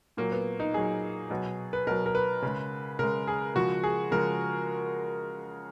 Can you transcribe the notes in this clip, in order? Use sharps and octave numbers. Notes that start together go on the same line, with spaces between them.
A#2 F#3 A#3
B3
D#4
A#2 F#3 G#4
B2 F#3
B4
B2 F#3 A#4
A#4
B4
C#3 G#3
C#3 G#3 A#4
G#4
C#3 F3 G#3 F#4
G#4
C#3 F3 G#3 A#4